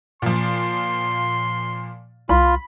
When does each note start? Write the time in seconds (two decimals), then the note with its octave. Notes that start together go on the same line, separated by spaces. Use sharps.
0.22 A#2 F3 C6
2.29 C2 F4 B5